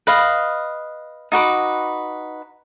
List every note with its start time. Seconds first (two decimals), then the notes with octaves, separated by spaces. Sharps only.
0.07 B4 D#5 F5
1.32 D#4 F#4 B4 D6